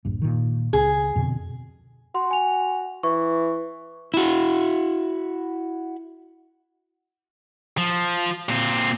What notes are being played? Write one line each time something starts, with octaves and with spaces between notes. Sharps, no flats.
D#1 A#1 G2
A#2 D#3
C#2 G#4
F2 B2 D3
F#4 C6
G#5 F7
E3 C#6
E4 F#4
F3
A#2 C4